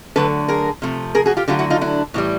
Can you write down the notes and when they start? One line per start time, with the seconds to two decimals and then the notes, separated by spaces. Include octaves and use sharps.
0.16 D3 F#3 A3 A4 B4
0.48 G#4 A#4
0.82 C3 F3 A3
1.15 G#4 A#4
1.26 F#4 G#4
1.37 F4 G4
1.48 D3 F#3 A3 F4 G4
1.59 E4 F#4
1.70 D#4 F4
1.81 D4 E4
2.14 A2 E3 G3